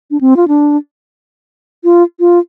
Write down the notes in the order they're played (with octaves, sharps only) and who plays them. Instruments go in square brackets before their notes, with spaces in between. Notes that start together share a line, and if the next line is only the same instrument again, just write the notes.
[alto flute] D4
C4
F4
D4
F4
F4